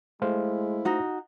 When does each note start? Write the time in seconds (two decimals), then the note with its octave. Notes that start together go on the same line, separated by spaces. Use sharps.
0.22 G#3 A3 E4 C5 F5
0.85 D#4 F#4